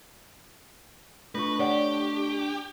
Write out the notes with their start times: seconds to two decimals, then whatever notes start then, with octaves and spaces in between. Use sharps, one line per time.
1.35 A3 D4 F4 B4 C#6
1.60 G4 C#5 D5 F#5